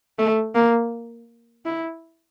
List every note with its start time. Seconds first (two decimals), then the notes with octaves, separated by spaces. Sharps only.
0.19 A3
0.55 A#3
1.66 E4